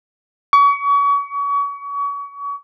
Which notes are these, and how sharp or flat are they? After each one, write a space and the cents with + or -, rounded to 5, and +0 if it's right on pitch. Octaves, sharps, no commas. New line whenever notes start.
C#6 +35